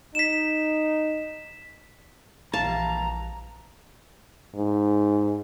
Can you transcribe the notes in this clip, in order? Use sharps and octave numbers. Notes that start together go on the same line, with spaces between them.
D#4 B6 E7
A#1 E3 G3 F5 A5 A#5
G#2